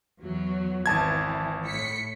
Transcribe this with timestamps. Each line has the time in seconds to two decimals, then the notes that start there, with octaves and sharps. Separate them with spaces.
0.20 E2 F#3
0.86 G#1 E3 A5 G#6
1.65 A2 B6 C#7